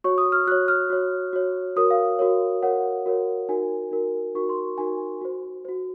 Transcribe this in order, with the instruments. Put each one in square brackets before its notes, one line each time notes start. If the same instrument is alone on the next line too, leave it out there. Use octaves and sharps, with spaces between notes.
[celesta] F#4 C#5 C#6
D#6
F6
F#4 F#6
C#5
F6
F#4 C#5
F#4 C#5
F#4 A#4 C#5 D#6
F5
F#4 A#4 C#5
F#4 A#4 C#5 F#5
F#4 A#4 C#5
D#4 F#4 A#4 G#5
D#4 F#4 A#4
D#4 F#4 A#4 C#6
C6
D#4 F#4 A#4 G#5
F#4 C5
F#4 C5